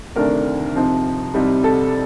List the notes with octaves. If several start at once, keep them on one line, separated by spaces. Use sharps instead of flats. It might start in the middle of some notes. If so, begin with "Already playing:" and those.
D2 C3 D#3 A3 D4 A#4
C3 F3 C4 D#4
C2 C3 G3 C4 D#4
A4